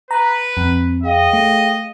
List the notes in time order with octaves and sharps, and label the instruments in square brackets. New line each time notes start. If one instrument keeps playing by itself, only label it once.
[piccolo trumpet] B4 [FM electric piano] A#5
[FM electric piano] F2 [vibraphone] C4
[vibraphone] G#4 F5 G5 [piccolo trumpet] D#5
[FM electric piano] A3